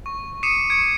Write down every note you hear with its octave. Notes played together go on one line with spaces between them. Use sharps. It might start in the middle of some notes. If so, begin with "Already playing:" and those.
C#6
D6 D#6 C7 C#7 D#7 E7
C#6 G#6 C#7 D7